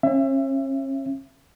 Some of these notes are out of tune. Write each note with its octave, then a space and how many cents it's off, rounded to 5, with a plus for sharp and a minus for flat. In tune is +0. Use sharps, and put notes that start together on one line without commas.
C#4 -40 E5 +25